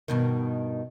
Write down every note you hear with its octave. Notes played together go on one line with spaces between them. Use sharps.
G2 B2 D#3